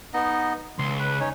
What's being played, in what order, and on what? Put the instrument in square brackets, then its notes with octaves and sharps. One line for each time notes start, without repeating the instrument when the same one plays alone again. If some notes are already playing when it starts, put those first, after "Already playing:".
[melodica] B3 D#4 D#5
[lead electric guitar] C#2 [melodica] C6
[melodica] B4
C#4 D#4 C#5